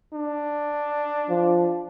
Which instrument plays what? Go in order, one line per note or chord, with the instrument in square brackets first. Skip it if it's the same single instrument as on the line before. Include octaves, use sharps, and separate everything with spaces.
[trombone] D4
[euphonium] F3